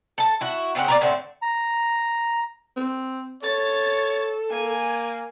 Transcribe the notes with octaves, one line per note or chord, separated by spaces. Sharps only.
A4 A5
E4 F#4
C#3 C4 C#4 F#5
A#4 B4 D5
A2 D3 A3 C4
A#5
C4
A4 C#5 A6
A#3 G#5